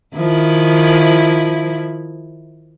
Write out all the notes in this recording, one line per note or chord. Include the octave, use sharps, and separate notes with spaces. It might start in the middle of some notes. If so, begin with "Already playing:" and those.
D#3 F3 E4